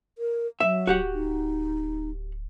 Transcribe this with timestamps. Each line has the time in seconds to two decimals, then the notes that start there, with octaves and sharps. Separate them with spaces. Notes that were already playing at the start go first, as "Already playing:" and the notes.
0.18 A#4
0.60 F#3 E5
0.87 D1 F#4 G4 F#5
1.13 D#4